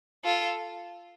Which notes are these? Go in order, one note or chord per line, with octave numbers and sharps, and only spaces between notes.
F4 A4